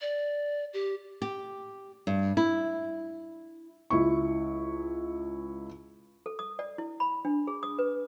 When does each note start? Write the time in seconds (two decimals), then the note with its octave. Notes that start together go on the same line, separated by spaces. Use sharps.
0.01 D5
0.73 G4
1.22 G4
2.07 G2
2.37 E4
3.90 C#2 E4 C#6
6.26 A4
6.39 D#6
6.59 D5
6.78 E4
7.00 B5
7.25 D4
7.47 G#4
7.63 D#6
7.79 B4